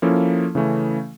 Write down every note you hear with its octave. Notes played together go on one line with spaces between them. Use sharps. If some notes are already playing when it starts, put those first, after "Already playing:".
F3 A#3 C#4 E4 A4
C#3 E3 A3 C#4